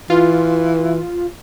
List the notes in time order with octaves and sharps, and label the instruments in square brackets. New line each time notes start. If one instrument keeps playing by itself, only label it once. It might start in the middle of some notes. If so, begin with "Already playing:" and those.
[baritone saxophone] E3 [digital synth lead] F4